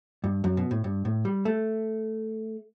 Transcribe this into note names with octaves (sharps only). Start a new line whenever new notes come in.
G2
F#2
B2
A2
G2
A2
G3
A3